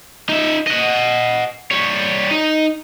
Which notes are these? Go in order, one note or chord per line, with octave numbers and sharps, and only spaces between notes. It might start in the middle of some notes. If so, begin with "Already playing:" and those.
D#4 E5
D#5 F#5
G3 C#5
D#4